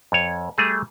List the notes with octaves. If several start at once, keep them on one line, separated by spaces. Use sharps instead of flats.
F2 C#5
G3 A3 G#4